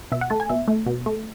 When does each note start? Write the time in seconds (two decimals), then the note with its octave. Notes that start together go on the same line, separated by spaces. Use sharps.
0.12 B2 E5
0.21 F#5
0.30 A3 A5
0.40 G#5
0.49 B2 E5
0.68 A3
0.86 B2
1.06 A3